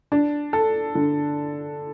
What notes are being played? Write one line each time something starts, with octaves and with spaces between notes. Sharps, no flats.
D4
A4
D3